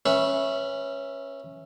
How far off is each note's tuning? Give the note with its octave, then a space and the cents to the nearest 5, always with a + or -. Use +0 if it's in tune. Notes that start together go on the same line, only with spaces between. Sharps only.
C#4 -10 B4 -20 E5 +0